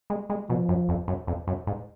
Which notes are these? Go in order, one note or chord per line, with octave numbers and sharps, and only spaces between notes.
G#3
G#3
B2 F3
F#2
F2
F#2
F2
F#2
G#2